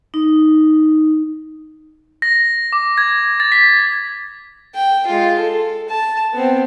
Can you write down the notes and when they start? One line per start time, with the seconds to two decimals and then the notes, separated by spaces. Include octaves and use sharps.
0.14 D#4
2.22 A#6
2.73 D6
2.98 G#6
3.40 A6
3.52 B6
4.75 G5
5.07 G#3 F4
5.39 A4
5.89 A5
6.33 B3 C4